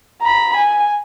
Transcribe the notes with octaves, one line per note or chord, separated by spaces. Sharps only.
A#5 B5
G#5